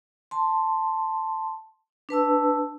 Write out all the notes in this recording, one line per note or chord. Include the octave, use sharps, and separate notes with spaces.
A5 C6
D4 B4 A5 E6